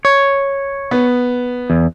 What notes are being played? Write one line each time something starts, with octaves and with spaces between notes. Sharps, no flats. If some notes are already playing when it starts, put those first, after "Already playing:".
C#5
B3
E2